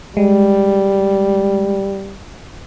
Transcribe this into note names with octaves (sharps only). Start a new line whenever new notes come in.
G3 G#3